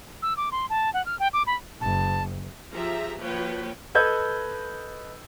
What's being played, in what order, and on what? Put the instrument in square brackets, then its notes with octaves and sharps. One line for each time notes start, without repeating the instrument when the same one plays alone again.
[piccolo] E6
D6
C6
A5
F#5
F6
G5
D6
B5
[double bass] F#1 [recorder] A5
[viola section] F3 G4 G#4 E5 A#5
F3 A#3 F#4 B4 C#5 G5
[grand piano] A4 B4 D#5 E6 G6 G#6